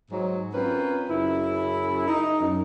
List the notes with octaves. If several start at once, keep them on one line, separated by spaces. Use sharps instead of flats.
G#2 F#3
C4 C#4 F4 A#4 B4
F#2 C#3 C#4 E4
D#4
F#2